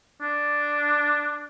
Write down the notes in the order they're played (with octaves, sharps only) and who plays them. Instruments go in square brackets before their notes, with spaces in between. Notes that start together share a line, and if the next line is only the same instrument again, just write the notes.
[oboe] D4